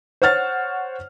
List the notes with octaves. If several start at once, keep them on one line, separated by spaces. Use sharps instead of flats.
C5 C#5 F#5 F6 A6